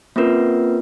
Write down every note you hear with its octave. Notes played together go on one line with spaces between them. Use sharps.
A#3 C4 C#4 F4 A#4 B4